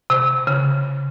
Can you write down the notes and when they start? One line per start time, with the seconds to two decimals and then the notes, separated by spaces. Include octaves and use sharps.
0.10 C3
0.47 C#3